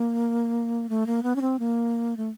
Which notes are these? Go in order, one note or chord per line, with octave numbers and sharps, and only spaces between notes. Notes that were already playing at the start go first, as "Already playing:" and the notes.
Already playing: A#3
A3
A#3
B3
C#4
C4
A#3
A3